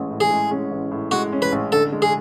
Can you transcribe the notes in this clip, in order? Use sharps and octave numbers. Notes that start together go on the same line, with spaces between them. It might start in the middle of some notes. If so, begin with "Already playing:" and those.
Already playing: A1 A2 G#3 C#4
A2
G#4
G#3
C#4
A1
A2
G#3 F#4
C#4
B4
A1
D3 A4
G#3
G#4